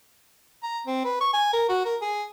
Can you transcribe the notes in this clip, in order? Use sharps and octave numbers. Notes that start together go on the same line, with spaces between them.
A#5
C4
B4
C#6
G#5
A#4
F#4
A#4
G#4